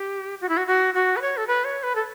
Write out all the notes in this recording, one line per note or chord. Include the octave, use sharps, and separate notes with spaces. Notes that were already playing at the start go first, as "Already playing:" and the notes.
Already playing: G4
F#4
E4
F#4
F#4
F#4
B4
C#5
A4
B4
C#5
B4
A4